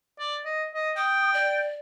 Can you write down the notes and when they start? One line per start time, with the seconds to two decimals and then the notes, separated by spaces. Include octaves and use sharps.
0.19 D5
0.45 D#5
0.74 D#5
0.97 G5 D#6
1.34 D5